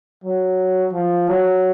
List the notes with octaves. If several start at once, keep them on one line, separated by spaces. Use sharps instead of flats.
F#3
F3
F#3